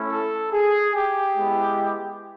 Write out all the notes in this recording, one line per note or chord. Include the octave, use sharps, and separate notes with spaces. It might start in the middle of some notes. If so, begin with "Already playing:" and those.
Already playing: A3 C#4 E4
A4
G#4
G4
G#3 B3 E4